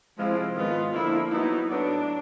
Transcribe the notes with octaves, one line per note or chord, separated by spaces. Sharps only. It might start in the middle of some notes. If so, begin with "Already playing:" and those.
C3 F3 G#3 C4 E4 F4
G#2 D#3 G#3 B3 F4
D3 F3 A#3 E4
F#3 B3 D#4 E4
A2 F#3 B3 D4